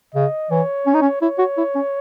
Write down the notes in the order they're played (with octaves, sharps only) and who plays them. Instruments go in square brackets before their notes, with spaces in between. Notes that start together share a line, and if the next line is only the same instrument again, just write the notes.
[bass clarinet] C#3 [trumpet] D#5
[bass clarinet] E3 [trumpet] C#5
[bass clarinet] C#4
D#4
C#4
[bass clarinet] E4 [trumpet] C#5
[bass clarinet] F#4
E4
C#4